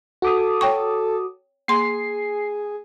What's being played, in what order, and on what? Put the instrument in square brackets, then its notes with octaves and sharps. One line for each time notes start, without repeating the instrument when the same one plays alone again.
[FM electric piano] F#4 D6 D#6 [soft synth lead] A4
[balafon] C#5 G5 C#6
[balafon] A#3 C6 [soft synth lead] G#4 [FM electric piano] C7